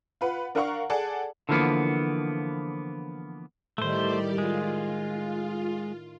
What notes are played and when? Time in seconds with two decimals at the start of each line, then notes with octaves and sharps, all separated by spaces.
0.21 F4 B4 F#5
0.55 D4 A#4 F5 F#5 A#5 C#6
0.90 G#4 A4 D5 F#5 G#5 A5
1.49 D3 E3 F3 A#3 B3
3.78 A2 D#3 G3 A3 G4 C5 D5
4.38 G#3 F4